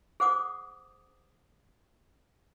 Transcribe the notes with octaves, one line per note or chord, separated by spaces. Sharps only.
G#4 C5 F#5 D6 D#6